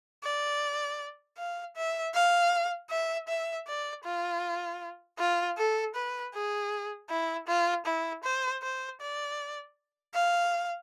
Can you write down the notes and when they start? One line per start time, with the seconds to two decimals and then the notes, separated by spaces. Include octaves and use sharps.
0.23 D5
1.37 F5
1.76 E5
2.14 F5
2.90 E5
3.28 E5
3.67 D5
4.04 F4
5.18 F4
5.57 A4
5.95 B4
6.33 G#4
7.09 E4
7.47 F4
7.85 E4
8.24 C5
8.62 C5
9.00 D5
10.14 F5